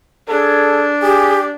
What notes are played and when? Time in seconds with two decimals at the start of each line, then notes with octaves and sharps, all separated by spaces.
0.29 D4 G#4 A4
1.02 G4 G#4